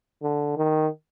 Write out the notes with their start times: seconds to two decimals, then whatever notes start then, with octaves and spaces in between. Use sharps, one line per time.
0.23 D3
0.57 D#3